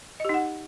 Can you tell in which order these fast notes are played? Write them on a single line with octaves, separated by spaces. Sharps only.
D#5 G4 D#4 F#5